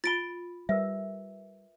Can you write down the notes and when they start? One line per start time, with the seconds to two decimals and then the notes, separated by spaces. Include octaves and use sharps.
0.04 F4 B5 A6 D7 G7
0.69 G3 A#4 B4 E5